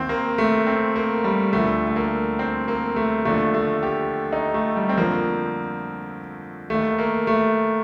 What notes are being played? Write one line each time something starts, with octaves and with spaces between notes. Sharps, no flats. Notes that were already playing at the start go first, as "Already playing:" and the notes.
Already playing: D#2 D#3 C4
A#3
A3
C4
A#3
G3
D2 D3 F3 A3
A3
A#3
C4
A#3
A3
D#2 D3 F3 A3
A3
G4
D#4
A3
G3
C4
F2 D3 F3 A#3
D#2 D#3 A3
A#3
A3